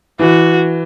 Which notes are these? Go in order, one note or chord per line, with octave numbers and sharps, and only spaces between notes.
E3 F#4